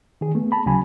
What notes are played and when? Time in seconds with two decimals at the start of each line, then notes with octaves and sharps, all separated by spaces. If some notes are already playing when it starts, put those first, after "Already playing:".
0.21 D#3 G#4
0.35 A3 B3
0.52 A5 B5
0.66 D2 C#3 F#3 G#5 B5